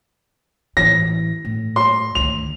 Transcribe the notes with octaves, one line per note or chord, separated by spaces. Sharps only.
A1 E3 A#6
A2
C6
D2 D#3 F7